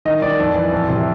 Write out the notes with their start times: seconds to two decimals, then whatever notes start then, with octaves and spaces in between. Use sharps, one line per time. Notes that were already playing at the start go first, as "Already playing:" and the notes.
0.05 D#3 D#5
0.22 D#3 D5
0.39 F2
0.55 E3
0.72 F2
0.89 C3